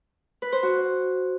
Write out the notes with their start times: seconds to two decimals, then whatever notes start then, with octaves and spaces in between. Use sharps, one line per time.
0.42 B4
0.52 C5
0.63 F#4